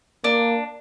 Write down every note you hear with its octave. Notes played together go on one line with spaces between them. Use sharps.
A#3 D4